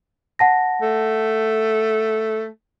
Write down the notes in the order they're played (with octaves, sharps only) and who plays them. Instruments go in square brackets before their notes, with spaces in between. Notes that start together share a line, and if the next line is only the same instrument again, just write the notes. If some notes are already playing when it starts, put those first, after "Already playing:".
[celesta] F#5 A5 A#6
[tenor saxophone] A3